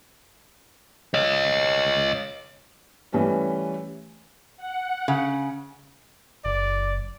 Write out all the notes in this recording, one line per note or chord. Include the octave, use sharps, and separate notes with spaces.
C#5 D#5
E3 G3 A3 C#4 B4
F#5
C#3
F#1 D5